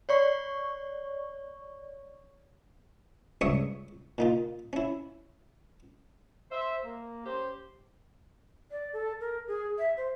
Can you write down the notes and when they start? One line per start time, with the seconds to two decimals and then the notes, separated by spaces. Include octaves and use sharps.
0.09 C#5 D5 C#6
3.41 C#2 G2 C#5 E5 C#6 D#6
4.18 A#2 D#4 F4
4.73 C#4 E4
6.51 C5 E5
6.84 A#3
7.26 C#4 G4 C5
8.71 D5
8.93 A4
9.21 A#4
9.48 G#4
9.78 E5
9.97 C5